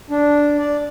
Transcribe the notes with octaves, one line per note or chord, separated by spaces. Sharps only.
D4
D5